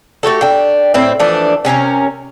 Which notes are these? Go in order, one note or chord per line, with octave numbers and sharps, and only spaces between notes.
A3 F#4 G4 A4
D4 G5
A2 C4 E4
E3 F3 A3 D4
C3 C#4 D4 A#4